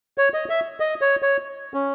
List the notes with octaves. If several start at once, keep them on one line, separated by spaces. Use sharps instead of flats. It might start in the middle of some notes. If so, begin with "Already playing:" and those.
C#5
D#5
E5
D#5
C#5
C#5
C#4